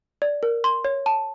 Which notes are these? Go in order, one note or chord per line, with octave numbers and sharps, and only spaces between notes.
D5
A#4
C6
C#5
A5